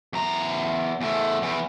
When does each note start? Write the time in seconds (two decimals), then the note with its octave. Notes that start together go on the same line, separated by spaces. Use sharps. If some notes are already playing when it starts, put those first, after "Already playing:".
0.13 E2 A#5
1.01 E2 A3
1.42 E2 E3